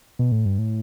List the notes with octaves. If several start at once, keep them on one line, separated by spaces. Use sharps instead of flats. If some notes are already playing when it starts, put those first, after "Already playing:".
B2
A2
G2
A2